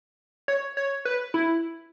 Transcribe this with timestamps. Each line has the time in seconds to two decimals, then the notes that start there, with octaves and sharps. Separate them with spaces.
0.48 C#5
0.77 C#5
1.05 B4
1.34 E4